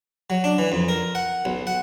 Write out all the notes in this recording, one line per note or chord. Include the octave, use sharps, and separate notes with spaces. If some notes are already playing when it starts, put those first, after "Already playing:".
F#3
D4
E3
F2
A#4
F#5
B1
F#5